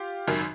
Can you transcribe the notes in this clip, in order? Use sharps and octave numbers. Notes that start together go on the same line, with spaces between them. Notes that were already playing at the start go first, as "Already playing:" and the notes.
Already playing: F4 G4
G#1 F#2 D#3